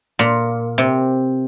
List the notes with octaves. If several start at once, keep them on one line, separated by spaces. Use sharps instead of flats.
A#2
C3